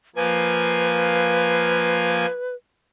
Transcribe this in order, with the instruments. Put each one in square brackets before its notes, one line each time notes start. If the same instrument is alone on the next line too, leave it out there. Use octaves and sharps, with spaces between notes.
[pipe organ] F3 A#3 G#5 [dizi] B4